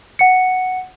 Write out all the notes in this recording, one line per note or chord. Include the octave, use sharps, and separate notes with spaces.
F#5 C#7